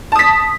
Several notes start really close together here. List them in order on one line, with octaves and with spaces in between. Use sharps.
A5 D#6 B6